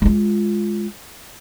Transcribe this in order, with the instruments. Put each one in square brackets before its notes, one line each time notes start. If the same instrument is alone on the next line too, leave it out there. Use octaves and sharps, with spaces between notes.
[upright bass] G#3 F4